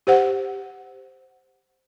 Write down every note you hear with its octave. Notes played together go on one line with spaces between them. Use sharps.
G4 C5 F#5